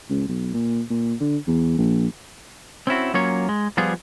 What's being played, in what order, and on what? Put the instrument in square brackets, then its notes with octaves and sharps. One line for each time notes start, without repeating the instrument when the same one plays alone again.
[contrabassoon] C#2
B1
A#2
A#2
D3
E2
A#1
[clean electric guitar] C4 C#4 E4 F#4
F#3 A#3 C#4 F4 C#5
G#3
F3 G3 B3 F4 G#4